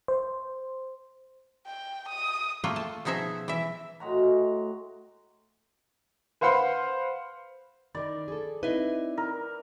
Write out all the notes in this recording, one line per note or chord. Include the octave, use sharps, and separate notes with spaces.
C5
G5
D#6
A3 A#3 F4 G5
A5
B2 F3 D#4 G#4 E5
E3 E5
A2 G#3 F#4 A#5
B4 C5 F5 F#5 B5 C6
D#3 A#4 D5
G#4 A4
C4 D#4 E4 B4 E5
A#4